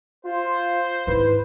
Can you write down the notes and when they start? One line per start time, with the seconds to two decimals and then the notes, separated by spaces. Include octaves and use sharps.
0.25 F4 C5
1.07 G#2 E4 B4